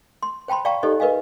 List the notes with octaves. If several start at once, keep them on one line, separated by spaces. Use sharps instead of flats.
C6
C5 G5 A5 B5 C6
D5 F5 G5 A5 A#5 C#6
D#4 G4 A4 C5 D5 D#5
A#4 B4 D#5 F5 G#5